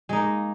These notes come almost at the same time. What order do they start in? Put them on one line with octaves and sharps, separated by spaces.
G#3 D#4 A#3